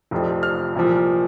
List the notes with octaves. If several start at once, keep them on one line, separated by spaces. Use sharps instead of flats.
F1 F2 C3 F3
F6
C2 A#2 F3